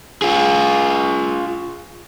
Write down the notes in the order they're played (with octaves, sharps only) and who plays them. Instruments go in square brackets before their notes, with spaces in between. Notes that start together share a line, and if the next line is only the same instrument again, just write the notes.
[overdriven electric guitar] F4 G#4